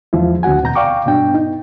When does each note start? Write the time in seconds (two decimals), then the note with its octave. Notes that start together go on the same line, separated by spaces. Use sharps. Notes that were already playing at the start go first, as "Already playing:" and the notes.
0.13 E2 F3 G#3 E4
0.43 D2 C4 F#4 F#5 G#5
0.62 D#2 B2 A#5 G6
0.75 D5 F5 G5 C#6 D6
1.06 G2 B2 B3 D4 G5
1.34 D#4